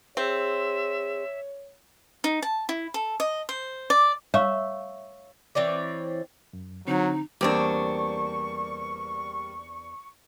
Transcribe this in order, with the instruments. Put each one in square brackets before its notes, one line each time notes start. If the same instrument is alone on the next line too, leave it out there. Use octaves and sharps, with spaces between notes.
[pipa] C4 [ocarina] G#4 [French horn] C#5 [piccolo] E5
[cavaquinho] D#4
A5
E4
A4
D#5
C5
D5
[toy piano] C#5 F5 C#6 [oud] E5
[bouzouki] E3 C4 C#5 D5
[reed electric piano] F#2
[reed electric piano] D3 C4 [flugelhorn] F#3 [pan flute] D#4
[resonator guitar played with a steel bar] E2 C4 D4 [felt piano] G3 A#3 [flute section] C#6